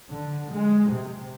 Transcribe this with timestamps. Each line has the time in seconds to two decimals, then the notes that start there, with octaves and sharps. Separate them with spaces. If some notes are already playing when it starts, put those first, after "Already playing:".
0.10 D3
0.52 G#3
0.89 C3